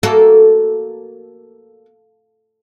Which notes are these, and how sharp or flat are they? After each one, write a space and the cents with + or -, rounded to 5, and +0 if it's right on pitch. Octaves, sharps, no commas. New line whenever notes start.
A#3 +0 F#4 +10 A4 +0